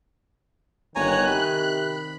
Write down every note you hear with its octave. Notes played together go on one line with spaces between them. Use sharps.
G1 D#3 C#5 G#5 A#5 F#6
C3 B5